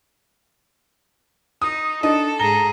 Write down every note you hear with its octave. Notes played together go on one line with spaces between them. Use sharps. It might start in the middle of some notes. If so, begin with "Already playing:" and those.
D#4 D#6
D4 D#4 A4 D#5
G#2 G#4 A#5 G7